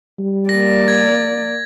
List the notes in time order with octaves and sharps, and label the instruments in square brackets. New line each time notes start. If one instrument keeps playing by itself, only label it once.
[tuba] G3
[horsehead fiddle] A#3 D5 [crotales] A#6
[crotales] G#6